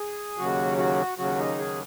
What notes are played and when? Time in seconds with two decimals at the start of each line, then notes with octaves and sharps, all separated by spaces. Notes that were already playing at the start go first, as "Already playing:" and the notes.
Already playing: G#4
0.38 D#2 C#3 F#3 F#4
0.78 F#4
1.18 D#2 C#3 F#3 F#4
1.39 D#4
1.58 G#4